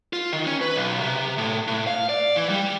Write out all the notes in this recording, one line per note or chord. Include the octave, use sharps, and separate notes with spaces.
F4
D#3
C#4
B4
B1
C3
A2
A2
F5
D5
E3
G3